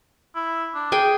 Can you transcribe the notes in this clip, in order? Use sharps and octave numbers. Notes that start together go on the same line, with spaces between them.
E4
D4
G#4 G5 G#5